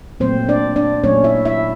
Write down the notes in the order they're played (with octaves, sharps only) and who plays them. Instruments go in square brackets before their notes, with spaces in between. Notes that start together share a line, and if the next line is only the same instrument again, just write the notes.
[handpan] A#2 F#3 A3 C4 C5
D4 D5
D4 D5
A#2 F#3 A3 C#4 C#5
E4 E5
E4 E5